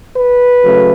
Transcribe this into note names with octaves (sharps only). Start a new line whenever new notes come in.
B4
C#3 F#3 A3